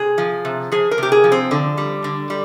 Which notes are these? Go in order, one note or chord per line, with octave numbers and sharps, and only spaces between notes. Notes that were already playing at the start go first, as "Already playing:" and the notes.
Already playing: C3 G#4
F3
C3
F3 G#4
A#4
C3 G4
G#4
F3
C4
D3
G3
D3
G3